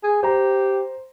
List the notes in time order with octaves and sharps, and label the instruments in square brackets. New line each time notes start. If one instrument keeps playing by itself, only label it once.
[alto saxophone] G#4
[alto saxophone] G4 [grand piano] C5 A#5